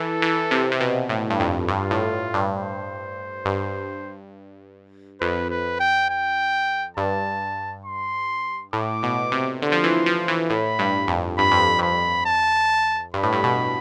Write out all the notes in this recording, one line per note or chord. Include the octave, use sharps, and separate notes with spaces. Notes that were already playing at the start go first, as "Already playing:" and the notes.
Already playing: E3 A4
E3
C3
C3
B2
A2
G2
F2
G2 F4
A2
G2
C5
G2
F2 B4
B4
G5
G5
G2 A5
C6
A2 D6
B2
C3
D3 C6
F3
E3
F3
E3
A2 B5
G2
F2
G2 B5
F2
F2 B5
A5
G2 B5
A2
G2
B2